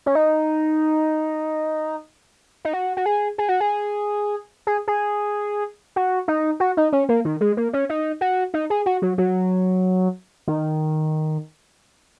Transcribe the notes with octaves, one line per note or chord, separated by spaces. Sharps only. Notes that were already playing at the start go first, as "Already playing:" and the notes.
C#4
D#4
D#4
F#4
F#4
G#4
G#4
F#4
G#4
G#4
G#4
F#4
D#4
F#4
D#4
C#4
A#3
D#3
G#3
A#3
C#4
D#4
F#4
D#4
G#4
F#4
F#3
F#3
D#3